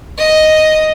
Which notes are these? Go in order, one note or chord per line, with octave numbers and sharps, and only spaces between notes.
D#5